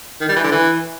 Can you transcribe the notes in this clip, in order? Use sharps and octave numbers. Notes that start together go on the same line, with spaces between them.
D#3
G3
E3
D3
E3